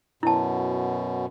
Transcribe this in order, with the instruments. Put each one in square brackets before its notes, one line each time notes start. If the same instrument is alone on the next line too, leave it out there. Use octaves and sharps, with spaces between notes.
[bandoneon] F#2 B2 [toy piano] E4 A5